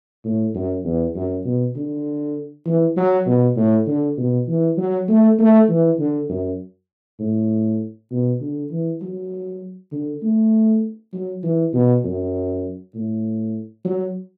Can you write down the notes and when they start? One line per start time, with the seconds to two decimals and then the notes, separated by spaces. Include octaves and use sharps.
0.24 A2
0.55 F#2
0.84 E2
1.15 F#2
1.44 B2
1.75 D3
2.66 E3
2.97 F#3
3.26 B2
3.57 A2
3.87 D3
4.17 B2
4.48 E3
4.77 F#3
5.08 A3
5.38 A3
5.69 E3
5.99 D3
6.29 F#2
7.19 A2
8.11 B2
8.41 D3
8.71 E3
9.01 F#3
9.92 D3
10.22 A3
11.13 F#3
11.43 E3
11.73 B2
12.04 F#2
12.95 A2
13.85 F#3